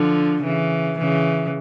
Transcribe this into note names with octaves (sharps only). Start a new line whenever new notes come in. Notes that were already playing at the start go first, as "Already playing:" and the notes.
Already playing: D3 F3
C#3 E3
C#3 E3